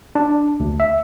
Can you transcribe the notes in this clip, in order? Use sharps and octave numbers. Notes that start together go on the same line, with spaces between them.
D4
D2
E5